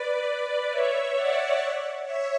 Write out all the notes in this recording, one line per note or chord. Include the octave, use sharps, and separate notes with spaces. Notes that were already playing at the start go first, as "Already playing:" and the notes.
Already playing: B4 D5
C#5 E5
D5 F#5
C#5 E5